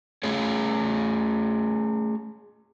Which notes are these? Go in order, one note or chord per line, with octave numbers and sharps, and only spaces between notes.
A3 C#4 G#4 C#5